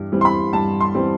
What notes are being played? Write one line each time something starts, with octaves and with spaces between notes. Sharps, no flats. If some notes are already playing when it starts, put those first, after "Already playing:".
Already playing: G2 E3 G3
E3 G3 C4
C6
B5
G2 A5
C6
E3 G3 C4